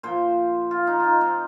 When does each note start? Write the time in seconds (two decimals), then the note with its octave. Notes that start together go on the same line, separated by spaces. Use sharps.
0.03 A#2 F3 C5
0.71 F4
0.87 D#4
1.00 D#4 F4
1.21 C4